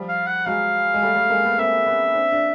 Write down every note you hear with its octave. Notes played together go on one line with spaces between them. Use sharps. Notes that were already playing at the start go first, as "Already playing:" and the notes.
Already playing: F3 G3
F5
F#5
F#3 G#3 F5
G#3
G3 A3
G3 A3
G#3 A#3
A3 B3
A#3 C4 E5
B3 C#4
C4 D4
D4